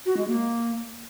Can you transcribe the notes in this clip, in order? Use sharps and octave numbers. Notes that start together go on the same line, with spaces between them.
F#4
G#3
A#3